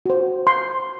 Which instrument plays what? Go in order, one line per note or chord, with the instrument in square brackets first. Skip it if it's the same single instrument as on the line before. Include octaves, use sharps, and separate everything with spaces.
[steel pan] F#4 C5
C6